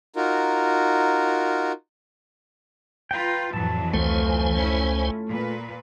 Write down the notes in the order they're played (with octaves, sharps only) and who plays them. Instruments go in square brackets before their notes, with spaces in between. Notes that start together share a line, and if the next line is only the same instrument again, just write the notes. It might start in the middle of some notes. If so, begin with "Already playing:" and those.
[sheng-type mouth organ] D#4 F4 F#4 A#4
[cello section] F4 B4 [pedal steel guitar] G5 A#5
[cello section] F2 E3 F#3 [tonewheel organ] A2 [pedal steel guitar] A5
[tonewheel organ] C#2 C5 G#5 [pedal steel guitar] A3 F4
[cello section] C#4 E4
A#2 B4